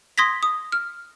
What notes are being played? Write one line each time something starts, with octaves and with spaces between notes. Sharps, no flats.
C6 D#6 G#6 A#6 B6
D#6
F6